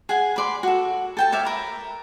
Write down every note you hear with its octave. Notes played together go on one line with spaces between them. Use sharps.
G#4 F#5 G#5
B4 D5 C6
F#4 A4
A4 G5 A5
C#5 D5 E5 F5
A#4 B4